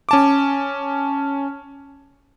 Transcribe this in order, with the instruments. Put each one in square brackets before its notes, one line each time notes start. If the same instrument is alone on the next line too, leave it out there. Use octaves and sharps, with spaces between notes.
[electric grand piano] C#4 A5 D6